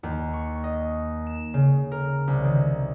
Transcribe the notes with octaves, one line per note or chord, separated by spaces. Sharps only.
D#2
C#6
D#5
E7
C#3
A#4
C2
D#3